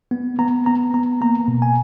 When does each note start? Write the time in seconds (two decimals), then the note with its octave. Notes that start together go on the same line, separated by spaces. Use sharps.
0.11 B3
0.39 B3 A#5
0.66 B3 A#5
0.94 B3 A#5
1.21 A#3 A#5
1.48 B2
1.62 G#5